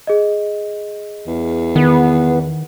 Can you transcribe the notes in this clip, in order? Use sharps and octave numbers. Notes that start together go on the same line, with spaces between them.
G#4 D#5
E2
D#3 B3